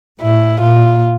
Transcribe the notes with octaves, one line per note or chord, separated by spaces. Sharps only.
A2 E4
A#2 F4